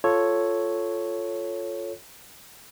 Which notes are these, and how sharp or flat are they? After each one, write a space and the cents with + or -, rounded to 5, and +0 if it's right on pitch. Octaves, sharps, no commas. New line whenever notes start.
F4 +0 A4 +0 C#5 +0